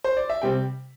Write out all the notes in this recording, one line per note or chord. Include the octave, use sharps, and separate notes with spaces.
C5
D5
E5
C3 G3 C4 G5